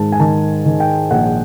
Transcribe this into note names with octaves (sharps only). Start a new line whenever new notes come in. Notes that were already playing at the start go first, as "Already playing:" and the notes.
Already playing: G#2 D#3 A5
G#5
D#3 A5
D#3
G5
A#1 F#5